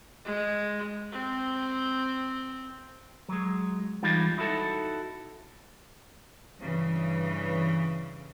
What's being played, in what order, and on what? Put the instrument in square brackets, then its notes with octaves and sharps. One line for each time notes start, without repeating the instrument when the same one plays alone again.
[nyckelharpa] G#3
C4
[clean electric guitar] F#3 G#3
E3 G3 G#3 D#4 F4
D#4 E4 F#4 A4
[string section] G2 C#3 E3